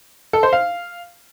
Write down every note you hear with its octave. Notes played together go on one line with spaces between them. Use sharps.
A4
C5
F5